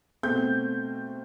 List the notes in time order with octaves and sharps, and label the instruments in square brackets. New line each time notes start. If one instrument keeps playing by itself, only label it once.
[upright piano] B2 A3 C4 G6